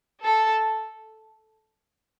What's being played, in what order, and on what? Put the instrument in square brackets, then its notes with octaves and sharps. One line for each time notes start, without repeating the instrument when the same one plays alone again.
[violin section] A4